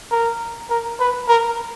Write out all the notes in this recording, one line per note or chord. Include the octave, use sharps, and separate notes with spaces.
A#4
A#4
B4
A#4